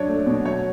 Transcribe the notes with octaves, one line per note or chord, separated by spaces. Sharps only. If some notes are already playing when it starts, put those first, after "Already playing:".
Already playing: F#3 D4 C#5
A3
B2
F#3 C#5